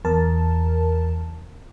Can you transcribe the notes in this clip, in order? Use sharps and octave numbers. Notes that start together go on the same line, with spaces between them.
E2 A#4 A5